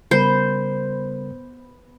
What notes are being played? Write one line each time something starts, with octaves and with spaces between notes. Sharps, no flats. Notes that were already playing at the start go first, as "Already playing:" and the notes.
C#3 G3 B3 A#4 C5 B5